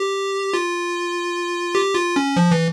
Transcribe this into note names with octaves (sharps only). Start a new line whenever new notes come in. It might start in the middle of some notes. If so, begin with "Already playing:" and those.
Already playing: G4
F4
G4
F4
C#4
F3
E3